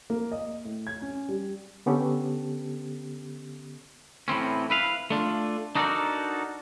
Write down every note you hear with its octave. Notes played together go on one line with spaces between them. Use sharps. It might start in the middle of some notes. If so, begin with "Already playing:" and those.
A#3
D#5
A2
G#6
C#4
G3
D3 B3 C#4 G4 A4
A2 E3 C4 C#4
E4 B4 F5
A3 D4 F4
D4 D#4 F#4 A4 A#4 D5